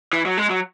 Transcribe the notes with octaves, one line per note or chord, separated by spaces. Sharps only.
E3
F#3
G#3
F#3